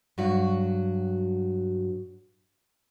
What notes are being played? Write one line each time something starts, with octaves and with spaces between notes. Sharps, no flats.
G2 F#3 F#4